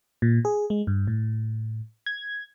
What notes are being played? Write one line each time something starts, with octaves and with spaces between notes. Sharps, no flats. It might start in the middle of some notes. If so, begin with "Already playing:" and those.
A#2
G#4
G#3
G2
A2
G#6